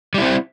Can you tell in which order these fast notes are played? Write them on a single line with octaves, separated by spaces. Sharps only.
G3 E4 C4